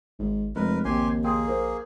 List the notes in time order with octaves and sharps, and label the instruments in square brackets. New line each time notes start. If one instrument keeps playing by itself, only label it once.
[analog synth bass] G#1 [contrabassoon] G#2
[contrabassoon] F1 [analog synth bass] G#3 [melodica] A#4 B4
[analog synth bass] A#1 [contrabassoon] D#2 [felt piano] C4 [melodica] G4 G#5 C6
[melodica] A#3 G#4 [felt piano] G5 C6 D#6
[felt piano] A#4 C5